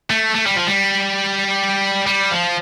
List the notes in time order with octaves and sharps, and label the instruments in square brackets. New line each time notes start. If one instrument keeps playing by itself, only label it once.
[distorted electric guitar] A3
A3
G3
F3
G3
G3
F3